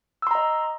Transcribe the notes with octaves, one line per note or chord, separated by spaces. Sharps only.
D#5 A#5 C6 E6